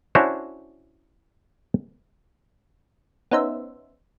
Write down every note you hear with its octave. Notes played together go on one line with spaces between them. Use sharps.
C#4 D4 E4 F#4 C5 C#5
B3 C#4 D#4 C5 E5